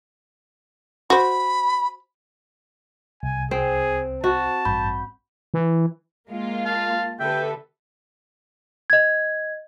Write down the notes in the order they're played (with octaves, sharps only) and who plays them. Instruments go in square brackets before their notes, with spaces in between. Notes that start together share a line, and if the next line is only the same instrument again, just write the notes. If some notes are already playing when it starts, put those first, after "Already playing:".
[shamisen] F#4 C5 [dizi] B5
[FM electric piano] C2 [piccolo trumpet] G#5
[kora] C4 [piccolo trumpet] G#4 [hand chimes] C5
[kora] F#4 [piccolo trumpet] A5
[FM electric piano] A1 G2 G6 [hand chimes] B5
[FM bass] E3
[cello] G#3 [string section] A#3 F4
[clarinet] F5 [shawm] A5
[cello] D3 [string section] G4 A4 B4 [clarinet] E5 [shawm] G5
[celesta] D#5 G#6